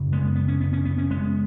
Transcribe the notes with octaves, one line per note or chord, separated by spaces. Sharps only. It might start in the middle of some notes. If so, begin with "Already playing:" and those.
Already playing: F#2 C#3
G#3 B3
B3
C#4
B3
C#4
B3
C#4
G#3 B3